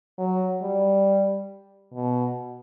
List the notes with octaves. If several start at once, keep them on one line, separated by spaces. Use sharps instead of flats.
F#3
G3
B2